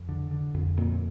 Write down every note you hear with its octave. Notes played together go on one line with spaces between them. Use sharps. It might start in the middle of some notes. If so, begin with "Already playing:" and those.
Already playing: F2
D3
D3
F2
F2 A#2 A#3